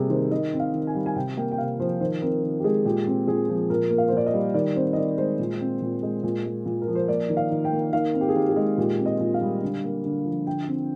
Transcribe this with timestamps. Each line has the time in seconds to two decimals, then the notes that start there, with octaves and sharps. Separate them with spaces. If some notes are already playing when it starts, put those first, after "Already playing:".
Already playing: C3 G3 A#3 G4 G#4
0.10 D#3 C5
0.31 D#3 D#5
0.53 C4
0.60 F5
0.74 D#3
0.87 G#5
0.95 G3
1.06 G#5
1.16 C3 G5
1.37 A#3 G5
1.51 G5
1.58 C3 F5
1.80 F3 C5
2.01 D#3 C5
2.22 C4 A#4
2.43 D#3
2.60 G4
2.64 G#3 G#4
2.85 A#2 G4
3.07 C4
3.27 A#2 G#4
3.49 F3
3.70 A#2 A#4
3.91 A#3
3.98 F5
4.08 C5
4.12 A#2 D5
4.26 D#5
4.34 G3
4.54 D#3 D5
4.75 C4 C5
4.93 D#5
4.97 D#3 D5
5.18 G#3 C5
5.39 A#2
5.60 C4
5.82 A#2
6.03 G#3
6.23 A#2
6.45 G#3
6.66 A#2
6.82 A#4
6.88 F3
6.95 C5
7.08 A#3 D5
7.29 D#3
7.37 F5
7.50 D#3
7.65 G5
7.72 A#3
7.93 D#3 F5
8.14 C4
8.21 G4
8.29 G#4
8.35 D#3 G4
8.49 G#4
8.56 G#3
8.78 A#2 G4
8.99 C4
9.06 D#5
9.20 A#2
9.34 F5
9.41 G3
9.62 D3
9.84 A#3
10.05 D3
10.26 F3
10.47 D3 G5
10.67 C4